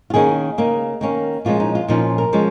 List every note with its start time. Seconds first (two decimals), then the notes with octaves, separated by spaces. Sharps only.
0.10 F4
0.14 D#3 A#3 C#4 G#4
0.58 C#3 A#3 D#4
1.01 D#3 A#3 C#4
1.45 A#2 F3 G#3 C#4 F4
1.60 D#4
1.75 F4
1.88 A#2 F3 C#4 D#4
2.18 A#4
2.33 F3 G#3 C#4